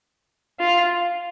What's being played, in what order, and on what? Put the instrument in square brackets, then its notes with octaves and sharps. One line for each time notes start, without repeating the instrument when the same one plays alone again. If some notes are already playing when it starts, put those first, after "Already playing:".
[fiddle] F4